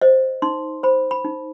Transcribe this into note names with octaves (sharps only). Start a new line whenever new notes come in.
C5 D#5
D#4 C6
C5 B5
B5
D#4